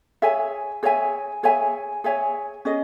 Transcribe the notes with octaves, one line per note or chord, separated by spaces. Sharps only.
G#4 C#5 E5 G#5
G#4 C#5 E5 G#5
G#4 C#5 E5 G#5
G#4 C#5 E5 G#5
C#4 G#4 D#5